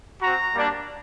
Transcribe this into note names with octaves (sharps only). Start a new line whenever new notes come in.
C4 F#4 A#5
G3 A#3 D4